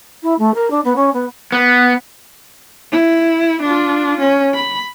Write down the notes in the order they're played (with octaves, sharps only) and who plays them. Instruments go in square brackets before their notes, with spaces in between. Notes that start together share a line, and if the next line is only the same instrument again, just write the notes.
[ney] E4
A3
A#4
D4
B3
C#4
B3
[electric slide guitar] B3
[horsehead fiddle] E4
D4 F4
C#4
B5